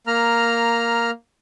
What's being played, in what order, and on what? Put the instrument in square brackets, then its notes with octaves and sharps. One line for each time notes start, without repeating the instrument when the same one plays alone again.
[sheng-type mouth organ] A#3 A#5 F6